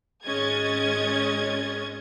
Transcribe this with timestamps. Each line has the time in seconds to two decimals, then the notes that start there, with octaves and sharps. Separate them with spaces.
0.25 G#1 G#3 C#4 D#5 G#6 A6